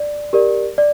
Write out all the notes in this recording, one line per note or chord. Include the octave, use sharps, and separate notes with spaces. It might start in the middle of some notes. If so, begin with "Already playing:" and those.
Already playing: D5
G4 A#4 D5
D5